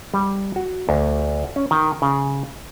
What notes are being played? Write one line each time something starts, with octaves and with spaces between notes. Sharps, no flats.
G3
F#4
D2
C#4
D#3
C#3